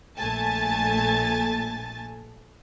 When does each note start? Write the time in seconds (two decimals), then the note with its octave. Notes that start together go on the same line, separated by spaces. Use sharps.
0.18 A#1 A#2 A3 G#5 A5 A6